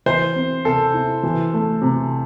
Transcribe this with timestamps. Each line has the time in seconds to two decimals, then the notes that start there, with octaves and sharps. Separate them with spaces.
0.06 E3 C5
0.35 C4
0.65 C3 A4
0.94 E4
1.23 E3
1.53 A3
1.82 C3